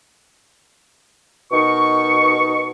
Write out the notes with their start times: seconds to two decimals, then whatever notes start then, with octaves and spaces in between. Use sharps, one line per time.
1.52 B2 D#4 A#4 C#6